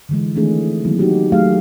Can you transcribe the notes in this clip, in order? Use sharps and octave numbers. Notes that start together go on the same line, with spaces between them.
D3 E3 G#3
D#3 E3 A3 C4 D4 G#4
D#3 F#3 A#3 C4 E4
D#4 F#4 G4
F#3 A3 G4 G#4 F5